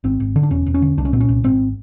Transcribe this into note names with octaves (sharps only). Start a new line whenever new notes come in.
G#1 C4
G#1
D3
D4
E1 C#4
E1
C#4
D3
C2 D4
C#4
A#2 C4
C#4
C2
G#1 C4